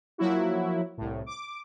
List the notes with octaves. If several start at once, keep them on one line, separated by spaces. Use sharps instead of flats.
F3 F#3 A#3 E4 F#4
C2 A2
D6